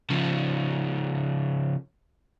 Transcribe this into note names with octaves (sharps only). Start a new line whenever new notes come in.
C#3 F3